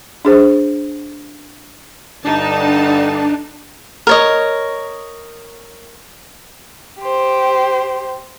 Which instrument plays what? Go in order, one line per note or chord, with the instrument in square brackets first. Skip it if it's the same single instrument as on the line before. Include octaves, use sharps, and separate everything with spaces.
[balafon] D4 G#4 C5
[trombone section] G2 D3 [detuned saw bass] D4 [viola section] D#4 A5
[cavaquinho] A#4 C#5 D#5
[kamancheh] G4 C5